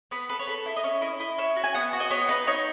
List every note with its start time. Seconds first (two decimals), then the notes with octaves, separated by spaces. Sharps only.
0.11 B3 B4
0.29 A4 B4
0.39 C#5
0.47 A4 B4
0.66 E4
0.76 D#5
0.84 C#4 C#5
1.01 E4 D#5
1.20 E4 D#5
1.38 C#4 E5
1.56 F#4
1.64 G#5
1.75 B3 F#5
1.93 F#4
2.00 D#5
2.10 B3 C#5
2.28 D#4 B4
2.47 D#4 C#5